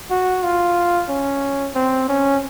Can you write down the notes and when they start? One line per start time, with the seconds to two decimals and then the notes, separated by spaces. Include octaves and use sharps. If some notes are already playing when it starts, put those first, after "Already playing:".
0.11 F#4
0.44 F4
1.09 C#4
1.75 C4
2.09 C#4